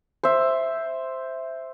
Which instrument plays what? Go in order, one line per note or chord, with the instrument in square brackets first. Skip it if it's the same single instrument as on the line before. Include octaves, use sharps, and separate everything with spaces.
[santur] C5 E5